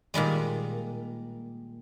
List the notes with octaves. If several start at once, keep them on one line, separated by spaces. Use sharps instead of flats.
A#2 D#3 G3 G#3